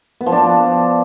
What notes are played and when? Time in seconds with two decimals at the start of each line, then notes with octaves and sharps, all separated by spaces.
0.21 B3
0.26 F3
0.32 D4